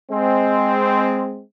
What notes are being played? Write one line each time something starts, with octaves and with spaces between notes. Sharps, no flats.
G#3 C4